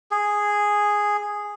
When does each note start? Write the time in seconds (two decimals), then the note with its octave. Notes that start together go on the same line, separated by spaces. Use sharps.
0.11 G#4